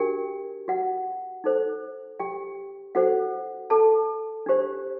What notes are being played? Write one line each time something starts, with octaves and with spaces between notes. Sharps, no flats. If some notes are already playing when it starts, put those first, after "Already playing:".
Already playing: D4 F#4 G4 A#4 G5
F#4 F#5
D#4 A4 C5
G4 G5
D4 F#4 A4 C5 F#5
A4 A5
D4 G4 C5